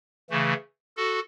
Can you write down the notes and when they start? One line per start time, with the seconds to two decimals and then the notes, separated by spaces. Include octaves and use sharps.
0.30 C#3 E3 A3
0.97 F#4 A4